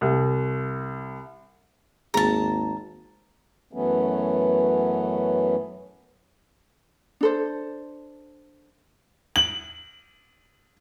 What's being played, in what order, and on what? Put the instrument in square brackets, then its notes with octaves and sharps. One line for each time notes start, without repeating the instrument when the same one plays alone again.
[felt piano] C2
[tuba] G#1 [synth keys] D#2 A#3 G#4 [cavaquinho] A5 A#5
[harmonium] F#2 E3 F#3 A3 B3 C#4
[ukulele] D4 A4 C5
[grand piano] F#7